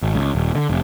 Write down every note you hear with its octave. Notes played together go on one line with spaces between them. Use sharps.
G#1
C#2
D#1
D3
F1